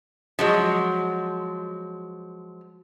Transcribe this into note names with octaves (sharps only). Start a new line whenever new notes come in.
F3 F#3 G#3